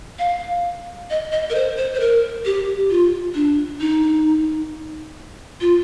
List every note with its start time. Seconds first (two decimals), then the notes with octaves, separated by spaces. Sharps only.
0.19 F5
1.10 D#5
1.32 D#5
1.50 A#4
1.55 C5
1.77 C5
1.95 C5
2.00 A#4
2.45 G4
2.90 F4
3.35 D4
3.80 D#4
5.61 F4